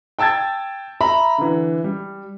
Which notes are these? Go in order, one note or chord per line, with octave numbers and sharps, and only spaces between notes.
G5 A5 E6 G#6 A6
E5 A#5 B5
D3 E3
G3